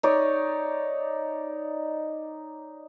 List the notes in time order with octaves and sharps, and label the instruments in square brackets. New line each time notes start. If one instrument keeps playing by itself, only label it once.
[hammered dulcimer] D#4 C#5 D5